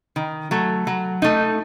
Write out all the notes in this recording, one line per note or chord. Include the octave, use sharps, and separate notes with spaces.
D#3
F#3 A3
F#3
A3 D#4